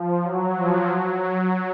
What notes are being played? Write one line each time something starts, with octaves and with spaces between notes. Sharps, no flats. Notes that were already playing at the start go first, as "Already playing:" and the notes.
Already playing: F3
F#3
F3
F#3
F#3